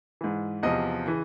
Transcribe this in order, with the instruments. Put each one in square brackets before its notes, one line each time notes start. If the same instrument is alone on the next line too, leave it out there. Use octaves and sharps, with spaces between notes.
[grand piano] G#2 E3
E2 C3 F3 D#5
C#3 E3